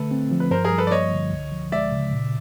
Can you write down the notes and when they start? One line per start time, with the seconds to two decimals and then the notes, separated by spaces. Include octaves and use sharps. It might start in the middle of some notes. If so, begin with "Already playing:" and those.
Already playing: D3 A3 A4 B4
0.11 C4
0.31 F3
0.40 B4
0.51 G2 A#4 C5
0.65 G#4 A#4
0.71 G3
0.78 A4 B4
0.87 D5
0.91 A#3 C#5 D#5
1.12 D3
1.32 C#2
1.52 F3
1.72 G#3 D5 E5
1.92 C#3
2.13 A#2